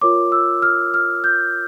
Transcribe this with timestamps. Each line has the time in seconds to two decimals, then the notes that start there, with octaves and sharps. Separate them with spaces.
0.01 F4 A#4 C#5 D6
0.32 E6
0.62 F6
0.94 F6
1.24 G6